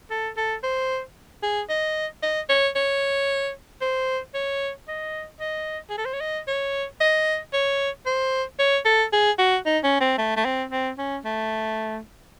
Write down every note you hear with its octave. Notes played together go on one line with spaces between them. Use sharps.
A4
A4
C5
G#4
D#5
D#5
C#5
C#5
C5
C#5
D#5
D#5
G#4
A4
C5
C#5
D#5
C#5
D#5
C#5
C5
C#5
A4
G#4
F#4
D#4
C#4
C4
A3
A3
C4
C4
C#4
A3